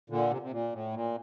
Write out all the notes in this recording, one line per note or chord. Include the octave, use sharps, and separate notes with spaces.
A#2 D3
C3
C3
A#2
A2
A#2